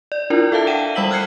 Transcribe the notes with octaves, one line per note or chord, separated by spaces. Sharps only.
D5
D4 E4 F4 A#4
A4 E5 F5 A5
F#5 G5 D#7 E7
G3 B5 E6 B6 F#7 G7
F6 F#6 G#6 C7 C#7